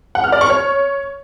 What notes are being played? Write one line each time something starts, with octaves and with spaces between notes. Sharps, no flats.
F#5
F6
D5
C#6
C#5